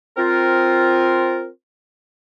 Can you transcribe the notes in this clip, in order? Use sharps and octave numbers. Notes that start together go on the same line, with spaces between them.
C4 F4 A#4